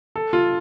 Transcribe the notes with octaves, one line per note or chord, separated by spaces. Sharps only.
A4
F4